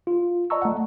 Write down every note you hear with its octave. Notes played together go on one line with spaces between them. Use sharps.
F4
D5 D#5 A5 A#5 C#6 E6
A3 F#5